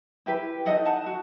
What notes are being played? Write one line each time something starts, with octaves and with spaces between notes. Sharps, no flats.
E4 G4 B4
D#4 F#4 A4 D#5 F#5
F#5 A5
F#4